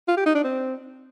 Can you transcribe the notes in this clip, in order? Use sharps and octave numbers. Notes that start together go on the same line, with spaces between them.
F4
G4
D#4
D4
C4